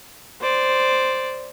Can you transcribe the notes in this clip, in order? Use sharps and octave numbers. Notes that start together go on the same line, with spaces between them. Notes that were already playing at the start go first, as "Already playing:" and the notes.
C5 D5